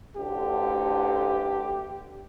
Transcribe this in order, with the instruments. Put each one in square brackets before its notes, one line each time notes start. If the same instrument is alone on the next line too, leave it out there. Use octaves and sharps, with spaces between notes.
[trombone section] A1 D2 D3 [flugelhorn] G4